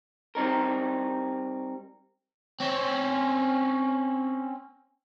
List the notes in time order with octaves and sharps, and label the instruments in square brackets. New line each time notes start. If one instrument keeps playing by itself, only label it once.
[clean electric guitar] G3 C4 D#4 A#4
[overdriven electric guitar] C4 C#4